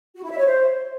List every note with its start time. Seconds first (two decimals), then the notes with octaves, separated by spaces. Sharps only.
0.15 F#4
0.23 E4
0.30 E5
0.37 C#5
0.45 C5